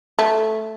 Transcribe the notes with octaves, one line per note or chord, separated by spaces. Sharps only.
A3